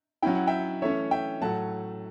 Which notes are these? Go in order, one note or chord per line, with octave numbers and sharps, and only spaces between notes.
F#3 C#4 E4 G5
F#5
E5 G5
E3 A3 C#4 C#5 E5
E5 G5
A2 F#3 A3 F#5 A5